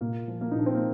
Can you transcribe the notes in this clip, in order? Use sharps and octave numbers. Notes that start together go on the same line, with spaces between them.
A#2 A#3
F3
A#3
D#4
A#2 D4
C4
A#3